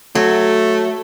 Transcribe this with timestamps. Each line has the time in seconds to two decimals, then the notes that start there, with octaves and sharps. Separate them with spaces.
0.15 F#3 A3